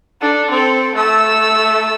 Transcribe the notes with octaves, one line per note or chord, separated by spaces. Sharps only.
D4 A4
C4 A4
A3 E6